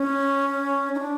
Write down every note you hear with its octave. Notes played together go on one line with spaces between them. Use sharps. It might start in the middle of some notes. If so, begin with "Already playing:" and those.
Already playing: C#4
D#4
D4